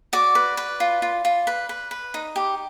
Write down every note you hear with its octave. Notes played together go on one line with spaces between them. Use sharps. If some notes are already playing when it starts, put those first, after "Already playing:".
F#4 D5 D6
B4
B4
F4
F4
F4
B4
B4
B4
D#4
G4